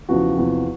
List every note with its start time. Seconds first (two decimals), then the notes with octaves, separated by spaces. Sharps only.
0.09 E2 C#3 F3 F#4
0.38 E2 C3 F3